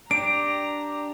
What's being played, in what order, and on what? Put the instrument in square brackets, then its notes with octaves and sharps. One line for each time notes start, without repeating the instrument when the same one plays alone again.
[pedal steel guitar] D4 G4 [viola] A#5 [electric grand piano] D7